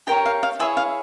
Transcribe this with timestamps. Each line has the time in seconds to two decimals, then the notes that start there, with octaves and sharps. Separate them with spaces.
0.07 G4 A#4 C#5 G5
0.26 F5
0.43 F5
0.59 E4 G#4 C#5 E5
0.77 F5